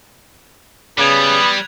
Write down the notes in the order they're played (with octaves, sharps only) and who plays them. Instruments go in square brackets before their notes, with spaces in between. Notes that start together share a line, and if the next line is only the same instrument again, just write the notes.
[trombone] C#3 [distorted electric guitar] G3 [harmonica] B3 [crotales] F#6 G#6 F7